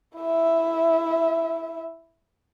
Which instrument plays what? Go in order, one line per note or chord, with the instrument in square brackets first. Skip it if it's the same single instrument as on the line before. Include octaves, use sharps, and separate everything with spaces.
[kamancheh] E4 E5